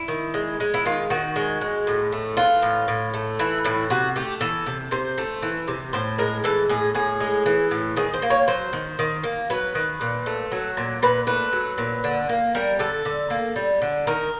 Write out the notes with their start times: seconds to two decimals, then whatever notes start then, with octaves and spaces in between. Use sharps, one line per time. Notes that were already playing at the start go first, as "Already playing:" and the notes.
Already playing: E4
0.08 D#3
0.34 G#3
0.60 G#3
0.74 E4
0.85 D#3 F4
1.10 D#3 F#4
1.36 G#3
1.61 G#3
1.87 A2
2.12 A3
2.37 E3 F4
2.62 A2
2.88 A2
3.14 A3
3.39 E3 E4
3.65 A2 E4
3.90 C3 F#4
4.16 A3 G4
4.41 E3 A4
4.67 C3
4.91 C3 C5
5.18 A3
5.42 E3
5.68 C3
5.93 A2 C5
6.18 G#3 A#4
6.44 E3 A4
6.69 A2 G#4
6.95 A2 G#4
7.20 G#3
7.46 E3
7.71 A2
7.97 D#3 G#4
8.14 C5
8.22 A#3
8.30 C#5
8.48 F#3 C5
8.73 D#3
8.99 D#3
9.23 A#3
9.50 F#3 B4
9.75 D#3
10.01 A#2
10.26 A3
10.52 F#3
10.77 A#2
11.02 A#2 B4
11.27 A3 B4
11.53 F#3
11.78 A#2
12.04 D3
12.29 A#3
12.55 G3 A#4
12.79 D3 A4
13.05 D3
13.30 A#3
13.56 G3
13.82 D3
14.07 D#3 A#4